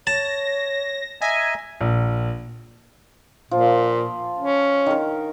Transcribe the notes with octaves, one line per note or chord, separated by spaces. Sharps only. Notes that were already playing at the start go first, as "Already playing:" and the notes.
C#5 A5 A#6
D#5 E5 G#5 A#5
A#1
A#2 F3
C#4
D#3 A#4